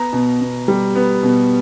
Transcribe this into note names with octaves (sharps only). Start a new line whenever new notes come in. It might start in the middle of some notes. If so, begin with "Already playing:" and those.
Already playing: B3 A#5
B2
B2
G3
B3
B2